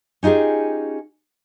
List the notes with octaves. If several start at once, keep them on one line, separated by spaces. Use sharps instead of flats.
C#4 D#4 F4 G4 G#4